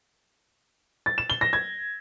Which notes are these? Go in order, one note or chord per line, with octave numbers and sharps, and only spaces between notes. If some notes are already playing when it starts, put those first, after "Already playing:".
A6
E7
G7
A#6
G#6